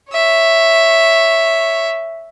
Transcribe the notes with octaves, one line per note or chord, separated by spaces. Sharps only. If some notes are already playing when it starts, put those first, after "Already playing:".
C#5 E5